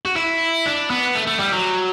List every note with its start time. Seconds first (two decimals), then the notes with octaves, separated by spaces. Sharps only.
0.05 F#4
0.16 E4
0.66 D4
0.90 B3
1.15 A3
1.27 A3
1.39 G3
1.52 F#3